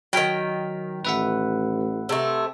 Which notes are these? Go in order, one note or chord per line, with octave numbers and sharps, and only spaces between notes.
D#3 F#3 G5 F6 B6
A1 B4 E5 F#5
C3 A3